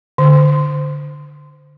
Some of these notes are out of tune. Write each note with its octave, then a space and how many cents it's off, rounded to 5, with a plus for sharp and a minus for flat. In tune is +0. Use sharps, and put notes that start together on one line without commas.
D3 +5